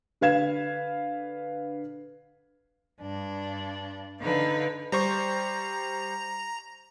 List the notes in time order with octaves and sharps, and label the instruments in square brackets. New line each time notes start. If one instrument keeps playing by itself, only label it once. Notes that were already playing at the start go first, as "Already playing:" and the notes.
[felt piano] D3 B4 F5 G#6 E7
[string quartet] G2 D4
D3 D#4 B4 F5
[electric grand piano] G3 C5 C#6 [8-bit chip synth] A#5